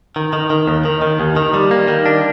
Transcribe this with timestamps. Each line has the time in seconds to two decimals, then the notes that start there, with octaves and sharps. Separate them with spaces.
0.16 D#3
0.33 D#3
0.50 D#3
0.67 D#2
0.85 D#3
1.02 D#3
1.20 D#2
1.36 D#3
1.54 G3
1.71 A#3
1.88 D#3
2.06 D4